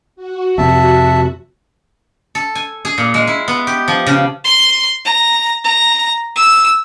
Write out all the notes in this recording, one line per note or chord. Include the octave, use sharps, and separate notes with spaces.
F#4
F2 C3 E5 A5
A4
G#5
G#4
A#2
G#3
E4
B3
G4
F3
C#3
C6
A#5
A#5
E6